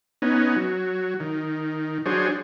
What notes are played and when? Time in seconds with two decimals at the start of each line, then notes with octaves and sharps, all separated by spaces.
0.22 B3 C#4 D#4
0.56 F#3
1.20 D#3
2.06 F#3 D4 G#4 C5 C#5